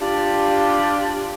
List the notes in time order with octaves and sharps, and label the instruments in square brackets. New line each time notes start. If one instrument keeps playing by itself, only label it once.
[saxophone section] D4 F4 G4